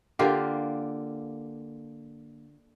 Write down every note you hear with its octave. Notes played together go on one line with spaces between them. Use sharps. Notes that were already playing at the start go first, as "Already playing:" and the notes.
D3 A#3 F4 G4